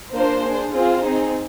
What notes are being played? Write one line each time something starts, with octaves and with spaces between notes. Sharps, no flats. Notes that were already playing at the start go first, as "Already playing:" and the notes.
A#3 D4 F4 C5
D4 G#4
C4 F4 G#4 C5
C4 D#4 G#4